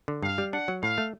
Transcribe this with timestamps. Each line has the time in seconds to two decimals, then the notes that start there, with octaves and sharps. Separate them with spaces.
0.08 D3
0.22 G2 F5
0.38 G3
0.53 D4 F#5
0.68 F#3
0.83 A2 F5
0.98 A3